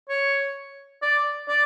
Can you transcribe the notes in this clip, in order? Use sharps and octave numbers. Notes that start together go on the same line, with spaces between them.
C#5
D5
D5